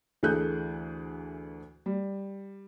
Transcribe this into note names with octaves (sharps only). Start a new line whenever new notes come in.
D2 E3 G#4 A4 F#6 G6
G3